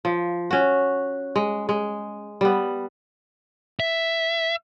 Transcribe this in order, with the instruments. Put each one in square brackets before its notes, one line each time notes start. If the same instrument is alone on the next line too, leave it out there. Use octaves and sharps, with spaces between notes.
[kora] F3
C#4 F#4
G#3
G#3
G3 B3
[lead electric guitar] E5